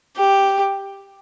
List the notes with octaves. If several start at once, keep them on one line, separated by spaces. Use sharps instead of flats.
G4